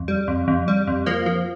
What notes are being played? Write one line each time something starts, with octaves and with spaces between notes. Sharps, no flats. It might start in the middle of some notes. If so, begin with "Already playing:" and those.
Already playing: F2
G3
F2
F2
G3
F2
F3 A#3
F3